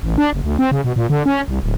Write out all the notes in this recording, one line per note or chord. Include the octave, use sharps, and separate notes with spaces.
A1
D4
F#1
D2
C4
C#3
B2
A#2
D3
C#4
C2
D1